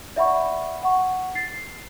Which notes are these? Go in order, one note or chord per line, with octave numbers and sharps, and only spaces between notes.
D5 E5 F#5 B5 C#6
F#5 C#6
A6 C7